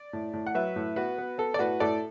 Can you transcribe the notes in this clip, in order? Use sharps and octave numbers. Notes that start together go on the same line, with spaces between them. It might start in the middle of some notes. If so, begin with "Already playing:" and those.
Already playing: D5
A2
A2
F#5
F#3 B4 E5
A2
B3 F#4 B4
B3
B3 A4
D5
A2 F#4 B4
A2 A4 D5